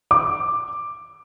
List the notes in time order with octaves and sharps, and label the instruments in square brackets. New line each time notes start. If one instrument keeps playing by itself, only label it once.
[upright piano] D6